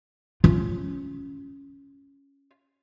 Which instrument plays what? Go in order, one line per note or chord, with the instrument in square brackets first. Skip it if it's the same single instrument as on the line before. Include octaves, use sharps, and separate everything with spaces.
[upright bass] C#4 F4